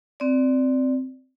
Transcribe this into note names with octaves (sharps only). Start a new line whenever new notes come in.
C4 D5